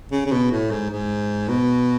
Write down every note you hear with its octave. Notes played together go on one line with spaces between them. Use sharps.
C#3
C#3
B2
A2
G#2
G#2
B2